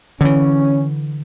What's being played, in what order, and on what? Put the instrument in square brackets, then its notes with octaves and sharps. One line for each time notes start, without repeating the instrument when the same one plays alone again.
[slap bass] D3 E3 [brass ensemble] C#4